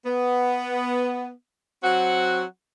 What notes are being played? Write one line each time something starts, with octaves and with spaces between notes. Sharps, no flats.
B3
F#3 C4 F#4 F#5